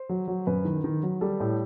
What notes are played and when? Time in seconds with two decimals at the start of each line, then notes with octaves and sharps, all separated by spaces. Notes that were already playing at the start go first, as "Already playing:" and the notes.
Already playing: C5
0.09 F#3
0.28 F#3
0.47 F#2 B4
0.65 D#3
0.84 D#3
1.03 F#3
1.21 G3 A4
1.40 A2